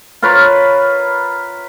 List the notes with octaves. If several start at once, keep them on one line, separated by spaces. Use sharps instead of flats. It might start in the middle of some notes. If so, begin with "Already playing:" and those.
F4 A#4 B4 C#5